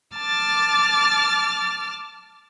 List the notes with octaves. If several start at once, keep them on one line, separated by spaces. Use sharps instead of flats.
A5 D6 F6 A6